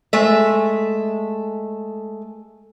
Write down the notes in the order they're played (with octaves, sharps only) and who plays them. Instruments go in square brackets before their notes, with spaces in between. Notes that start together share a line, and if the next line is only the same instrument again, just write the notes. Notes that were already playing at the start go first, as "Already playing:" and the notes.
[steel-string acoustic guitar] G#3 A3 E5